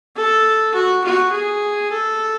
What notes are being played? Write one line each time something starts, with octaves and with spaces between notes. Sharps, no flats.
A4
F#4
F#4
G#4
A4